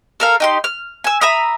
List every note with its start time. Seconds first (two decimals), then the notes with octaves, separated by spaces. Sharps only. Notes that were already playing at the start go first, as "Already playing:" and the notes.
0.20 A4 A#4 F5
0.40 D#4 G4 C6
0.64 F6
1.04 G#5 E6
1.21 E5 A#5 B5 D#6